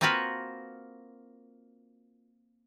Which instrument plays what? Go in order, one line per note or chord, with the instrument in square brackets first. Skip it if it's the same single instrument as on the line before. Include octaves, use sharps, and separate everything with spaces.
[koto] A#3 C4 F4 F#4 A#4 B4